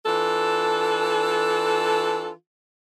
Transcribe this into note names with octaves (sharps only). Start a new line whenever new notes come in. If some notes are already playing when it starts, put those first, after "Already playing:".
E3 D4 F4 A4